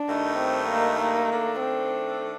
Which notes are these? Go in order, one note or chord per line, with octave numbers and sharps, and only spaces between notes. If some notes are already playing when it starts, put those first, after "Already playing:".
Already playing: D4
G2 D#3 A3 D#4
C4
A#3
A#3
D#3 A3 D4 A4
C4